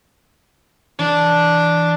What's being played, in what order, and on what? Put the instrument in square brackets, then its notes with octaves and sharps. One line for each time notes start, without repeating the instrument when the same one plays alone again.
[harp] E3 [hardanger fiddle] D4